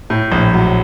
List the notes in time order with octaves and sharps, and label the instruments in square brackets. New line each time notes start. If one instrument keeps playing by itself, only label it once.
[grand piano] A2
A#1
F#3